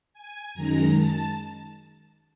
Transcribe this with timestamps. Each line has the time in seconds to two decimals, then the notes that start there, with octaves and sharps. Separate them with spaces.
0.13 G#5
0.54 F#2 D#3 G#3 A#5
0.95 A5